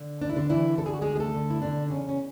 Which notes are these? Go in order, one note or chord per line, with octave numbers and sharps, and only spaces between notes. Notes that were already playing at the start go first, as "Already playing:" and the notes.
Already playing: D3
D2 D4
E4
D3 D4
D3 E3 E4
D3 A4
G#4
F#4
D2 G#3 G#4
G#4
A3 A4
D3
E4
B2 D3 D4
E2 C#3 C#4
C#4